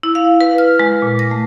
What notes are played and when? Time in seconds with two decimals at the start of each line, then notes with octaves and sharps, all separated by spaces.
0.03 E4
0.15 F5
0.41 B4
0.58 F6
0.80 G#3
1.02 A#2
1.19 A#6
1.31 A3